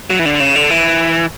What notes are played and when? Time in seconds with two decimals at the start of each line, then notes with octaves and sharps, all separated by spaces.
0.10 F#3
0.19 E3
0.26 D3
0.40 C#3
0.56 D3
0.70 E3